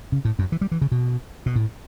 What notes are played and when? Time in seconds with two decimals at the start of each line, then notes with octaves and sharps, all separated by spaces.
0.12 C#3
0.25 A2
0.39 F#2
0.52 E3
0.61 G3
0.72 E3
0.81 C#3
0.92 B2
1.46 B2
1.56 A2